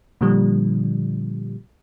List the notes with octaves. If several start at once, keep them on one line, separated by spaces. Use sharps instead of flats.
A#2 D3 F3 G3